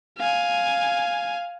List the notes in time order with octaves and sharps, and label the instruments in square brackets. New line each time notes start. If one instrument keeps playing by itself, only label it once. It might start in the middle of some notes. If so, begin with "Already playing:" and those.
[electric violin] F5 G#5